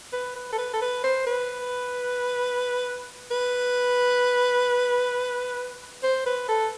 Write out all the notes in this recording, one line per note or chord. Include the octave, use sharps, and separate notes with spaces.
B4
B4
A4
B4
A4
B4
C5
B4
B4
C5
B4
A4